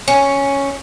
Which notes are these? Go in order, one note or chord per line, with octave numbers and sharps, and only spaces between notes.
C#4